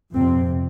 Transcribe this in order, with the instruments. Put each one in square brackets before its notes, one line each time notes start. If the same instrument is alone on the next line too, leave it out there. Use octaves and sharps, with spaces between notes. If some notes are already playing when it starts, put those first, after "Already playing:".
[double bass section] F2 C3 C4